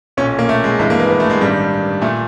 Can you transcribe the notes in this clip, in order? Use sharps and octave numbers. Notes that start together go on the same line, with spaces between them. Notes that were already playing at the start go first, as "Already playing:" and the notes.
B1 A#2 C#4
A#3
A3
G#3
G#1 G2 E3 G#3
A#3
B3
B3
A3
G#3
A1 G2 D#3 G3
A#2 A3